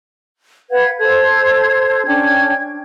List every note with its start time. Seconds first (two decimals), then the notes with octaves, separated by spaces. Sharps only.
0.71 B4 F5 F#5 G#6
0.98 A4 C5 G#6
2.06 C#4 D4 G5 G#6